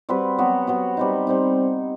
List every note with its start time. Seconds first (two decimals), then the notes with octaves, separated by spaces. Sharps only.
0.09 G3 C4 F#4 B4
0.38 F#3 B3 F#4
0.67 F#3 B3 F#4
0.97 G3 C4 D#4
1.27 G3 C4 D#4